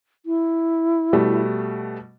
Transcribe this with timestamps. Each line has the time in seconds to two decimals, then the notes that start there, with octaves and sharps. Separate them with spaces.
0.26 E4
1.13 B2 G3 A3